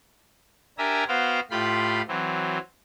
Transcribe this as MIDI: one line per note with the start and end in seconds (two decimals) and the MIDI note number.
0.78 1.04 62
0.78 1.04 67
0.78 1.04 70
0.78 1.04 76
0.78 1.04 80
0.78 1.04 82
1.08 1.40 59
1.08 1.40 66
1.08 1.40 72
1.08 1.40 77
1.08 1.40 79
1.50 2.01 45
1.50 2.01 65
1.50 2.01 67
1.50 2.01 83
1.50 2.01 84
2.08 2.58 52
2.08 2.58 54
2.08 2.58 60